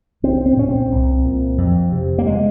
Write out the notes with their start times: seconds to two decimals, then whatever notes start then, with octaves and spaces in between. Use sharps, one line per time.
0.23 C2 C4
0.46 C4
0.57 A#2 C#4
0.69 C4
0.91 C2
1.25 A#2
1.58 F2
1.92 C3
2.18 A#3
2.27 G#3